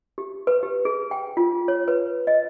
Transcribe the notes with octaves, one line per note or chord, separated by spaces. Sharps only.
G4
B4
G4
G#4
G5
F4
C#5
B4
D#5